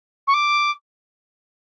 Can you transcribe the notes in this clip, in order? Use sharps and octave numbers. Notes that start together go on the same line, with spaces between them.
C#6
D6